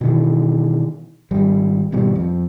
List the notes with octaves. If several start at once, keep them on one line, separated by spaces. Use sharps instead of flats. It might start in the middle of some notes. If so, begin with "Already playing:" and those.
B2 D#3 E3
G#1 G3
G#1 B2 G3
F2